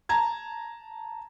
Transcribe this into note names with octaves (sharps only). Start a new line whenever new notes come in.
A5 A#5 G#6